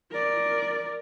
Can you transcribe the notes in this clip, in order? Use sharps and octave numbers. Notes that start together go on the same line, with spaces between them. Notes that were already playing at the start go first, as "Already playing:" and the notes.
A#4 D5